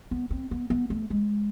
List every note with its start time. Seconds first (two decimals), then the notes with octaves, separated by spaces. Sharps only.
0.11 B3
0.30 C4
0.51 B3
0.70 B3
0.90 A3
1.10 G#3